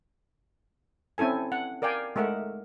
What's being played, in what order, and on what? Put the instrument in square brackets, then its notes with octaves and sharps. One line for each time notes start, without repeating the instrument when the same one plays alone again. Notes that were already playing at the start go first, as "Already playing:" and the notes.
[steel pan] C4 C#4 E4 A4 G#5
F#5
A#4 D5 F5 G5 G#5
G#3 A3 A#4 E5 F#5